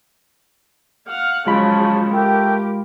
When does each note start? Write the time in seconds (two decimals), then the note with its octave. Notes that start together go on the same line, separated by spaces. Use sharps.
1.07 F5 F#5 F6
1.47 C#3 F3 F#3 G#3 F4 C#5 A5 B5
2.12 A3 G4 A#4 G5